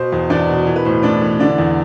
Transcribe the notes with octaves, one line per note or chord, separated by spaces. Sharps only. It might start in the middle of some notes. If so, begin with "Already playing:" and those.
Already playing: B2 C5
E2
E2 D4 D5
B2
E3
B4
A2 C5
A2 D4 D5
E3
D3 D4 D5
E2